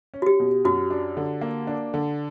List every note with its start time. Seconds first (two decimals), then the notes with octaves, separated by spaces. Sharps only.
0.14 C#4
0.22 F#4
0.26 G4
0.40 B2
0.64 F#2 F#4
0.90 D4
1.17 D3
1.41 A#3
1.67 D4
1.94 D3